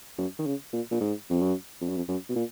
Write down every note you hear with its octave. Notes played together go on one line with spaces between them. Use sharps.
F#2
D#3
C#3
A#2
A#2
G#2
F2
F#2
F2
F#2
F2
F#2
B2
A#2